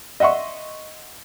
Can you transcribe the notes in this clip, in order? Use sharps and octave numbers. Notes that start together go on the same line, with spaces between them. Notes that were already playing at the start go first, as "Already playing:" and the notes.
D#5 E5 F#5 C6 C#6